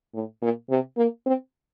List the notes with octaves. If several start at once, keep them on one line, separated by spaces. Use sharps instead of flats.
A2
A#2
C3
A#3
C4